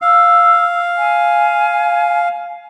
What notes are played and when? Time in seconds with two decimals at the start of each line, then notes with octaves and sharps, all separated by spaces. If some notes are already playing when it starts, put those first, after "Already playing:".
0.02 F5 E6
0.97 G#5